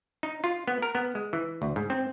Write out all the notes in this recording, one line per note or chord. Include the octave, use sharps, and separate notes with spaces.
D#4
F4
B3
A#4
B3
G#3
E3
D2
G#2
C4